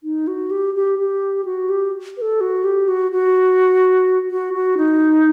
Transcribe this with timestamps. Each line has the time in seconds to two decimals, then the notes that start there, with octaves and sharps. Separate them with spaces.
0.04 D#4
0.27 F#4
0.51 G4
0.75 G4
0.99 G4
1.45 F#4
1.70 G4
2.17 B4
2.21 A4
2.41 F#4
2.64 G4
2.88 F#4
3.12 F#4
4.30 F#4
4.54 F#4
4.77 D#4